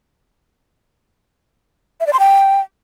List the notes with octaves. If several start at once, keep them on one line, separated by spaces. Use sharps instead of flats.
E5
D5
C6
G5